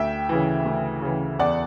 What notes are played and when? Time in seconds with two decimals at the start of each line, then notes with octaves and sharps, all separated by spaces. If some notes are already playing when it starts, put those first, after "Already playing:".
Already playing: D2 E5 G5
0.29 C#3 E3
0.66 D2
1.02 C#3 E3
1.39 E2 D5 F#5